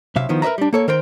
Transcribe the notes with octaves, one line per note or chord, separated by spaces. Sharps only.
B1 C3 E5 F5
D#3 F3 B3 E4
A#4 B4 D#5 E5 A#5
G3 D4
A#3 A4 C#5
D#3 A#4 C5 G5